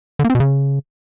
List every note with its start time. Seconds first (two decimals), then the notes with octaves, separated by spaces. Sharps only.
0.19 D3
0.24 A#3
0.30 C4
0.35 B2
0.40 C#3